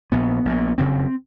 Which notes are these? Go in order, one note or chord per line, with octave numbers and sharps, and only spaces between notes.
A#1 A#2 B3
A#1 A#2
F#1 F2 C#3 C4